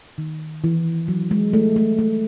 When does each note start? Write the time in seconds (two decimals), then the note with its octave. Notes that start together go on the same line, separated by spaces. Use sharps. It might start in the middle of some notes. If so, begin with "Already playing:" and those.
0.18 D#3
0.64 E3
1.08 F#3
1.31 G#3
1.53 A3
1.76 A3
1.99 A3